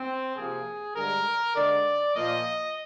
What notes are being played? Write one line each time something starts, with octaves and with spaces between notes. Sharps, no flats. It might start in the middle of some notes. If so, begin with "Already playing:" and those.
Already playing: C4
C3 F3 A#3 G#4
G2 D3 G#3 A#4
D3 G#3 D5
A#2 F3 A#3 D#5